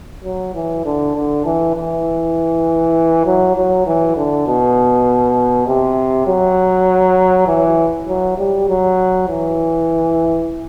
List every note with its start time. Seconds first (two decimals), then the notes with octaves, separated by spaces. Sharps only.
0.24 F#3
0.54 E3
0.85 D3
1.15 D3
1.45 E3
1.76 E3
3.26 F#3
3.56 F#3
3.87 E3
4.17 D3
4.47 B2
5.67 C3
6.27 F#3
7.47 E3
8.08 F#3
8.38 G3
8.68 F#3
9.29 E3